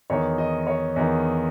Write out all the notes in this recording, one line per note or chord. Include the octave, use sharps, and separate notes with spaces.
E2 D#3 C#5
D#5
C#5
E2 D#3